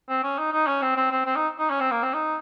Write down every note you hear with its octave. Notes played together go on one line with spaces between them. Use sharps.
C4
C#4
D#4
D#4
C#4
C4
C4
C4
C4
D#4
D#4
C#4
C4
A#3
C4
D#4